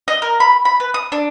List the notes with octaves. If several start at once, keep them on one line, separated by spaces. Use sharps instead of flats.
D#5
A#4
B5
B5
B4
D#6
D4